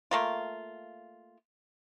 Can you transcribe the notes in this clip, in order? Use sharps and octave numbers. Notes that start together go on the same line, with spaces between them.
A3 A#3 F4